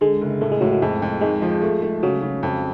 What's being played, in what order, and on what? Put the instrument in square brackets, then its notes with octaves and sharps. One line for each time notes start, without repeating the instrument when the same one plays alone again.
[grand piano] D3 [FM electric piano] G#3
[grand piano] F#1
[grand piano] A2 [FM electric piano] A3
[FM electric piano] G#3
[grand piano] A2 [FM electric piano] F#3
[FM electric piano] F#3
[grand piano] F2 [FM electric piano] G#3
[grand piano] F2
[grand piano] G#1 [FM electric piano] G#3
[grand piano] F3
A3
A3
[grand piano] C#3 [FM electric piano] F#3
[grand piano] C#3
F2